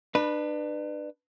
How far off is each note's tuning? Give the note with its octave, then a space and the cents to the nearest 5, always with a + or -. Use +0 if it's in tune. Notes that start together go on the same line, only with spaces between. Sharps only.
D4 +35 B4 +0